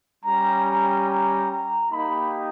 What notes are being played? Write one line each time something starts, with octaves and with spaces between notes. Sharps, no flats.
G3 C#4 G4 A#5
A#5
A#5
A#5
A#3 D#4 G4 B5